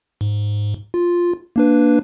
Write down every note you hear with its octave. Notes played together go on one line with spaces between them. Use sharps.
G#2
F4
A#3 D4 B4